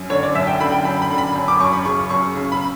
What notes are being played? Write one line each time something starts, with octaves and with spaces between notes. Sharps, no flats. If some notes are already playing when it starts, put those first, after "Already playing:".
Already playing: F#2
D3 C#5
D5
F#2 E5
G5
D3 B5
G5
F#2 B5
B5
D3
B5
F#2
D6
F#2 C#6
B5
C#3 C#6
F#2 C#6
C#3
B5